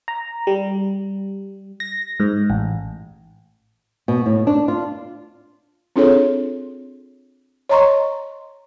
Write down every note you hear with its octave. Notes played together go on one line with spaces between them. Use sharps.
A#5
G3
A#6
G#2
A1
B2
A2
D4
F4
C4 D4 F4 G#4 A4 C#5
C#5 D#5 A#5 C6 C#6